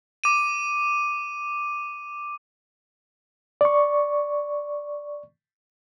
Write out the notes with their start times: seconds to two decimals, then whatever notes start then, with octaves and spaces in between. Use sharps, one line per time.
0.24 D6 D#7
3.61 D5 C#6